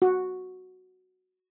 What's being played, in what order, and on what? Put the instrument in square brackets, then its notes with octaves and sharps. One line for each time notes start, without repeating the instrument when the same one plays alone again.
[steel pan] F#4